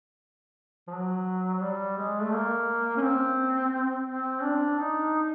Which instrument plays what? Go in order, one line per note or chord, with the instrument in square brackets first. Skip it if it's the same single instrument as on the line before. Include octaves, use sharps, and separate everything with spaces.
[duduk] F3
F#3
F#3
G3
G#3
A3
A#3
C#4
C4
C4
D4
D#4